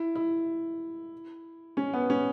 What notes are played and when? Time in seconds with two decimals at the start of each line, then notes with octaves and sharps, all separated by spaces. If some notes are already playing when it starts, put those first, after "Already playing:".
Already playing: E4
0.15 E4
1.77 C#4
1.93 B3
2.10 C#4